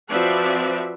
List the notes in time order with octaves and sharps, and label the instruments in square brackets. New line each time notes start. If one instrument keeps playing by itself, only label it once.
[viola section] F3 C4 F#4 B4 D5 E5